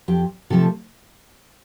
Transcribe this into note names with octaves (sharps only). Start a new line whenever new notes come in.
F2 G4
C3 F3 A3 A4